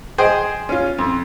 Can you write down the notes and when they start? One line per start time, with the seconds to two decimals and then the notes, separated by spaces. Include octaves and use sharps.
0.18 G#4 C5 D#5 G5
0.69 C#4 F4
0.98 F2